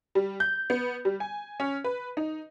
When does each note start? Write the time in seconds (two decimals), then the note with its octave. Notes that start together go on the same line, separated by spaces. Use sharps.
0.15 G3
0.40 G6
0.70 B3
1.05 G3
1.20 G#5
1.60 C#4
1.84 B4
2.17 D#4